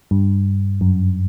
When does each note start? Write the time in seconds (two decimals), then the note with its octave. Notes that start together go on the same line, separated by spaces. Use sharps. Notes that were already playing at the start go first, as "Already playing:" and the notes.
0.11 G2
0.81 F#2